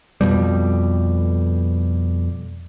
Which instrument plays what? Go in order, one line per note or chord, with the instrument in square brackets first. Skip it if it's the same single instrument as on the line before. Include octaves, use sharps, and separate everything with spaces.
[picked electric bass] F2 B2 G3